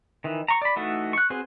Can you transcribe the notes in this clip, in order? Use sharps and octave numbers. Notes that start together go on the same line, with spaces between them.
D#3 E3
A#5 C#6
D5 B5
E3 A3 D#4 F#4 A4
C#6 F#6
C4 F#4 G#4 B4 C5